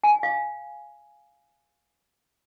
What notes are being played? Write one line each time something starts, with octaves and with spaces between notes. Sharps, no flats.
G#5
F5